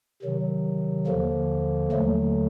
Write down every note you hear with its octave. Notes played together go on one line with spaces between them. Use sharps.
C3 D#3 F#3
D#2 D3 F3 A#3
D#2 D3 F#3 A3